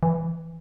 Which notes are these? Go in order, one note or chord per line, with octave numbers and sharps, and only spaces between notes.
E3